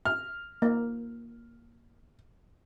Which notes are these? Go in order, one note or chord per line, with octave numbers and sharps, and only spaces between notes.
F6
A#3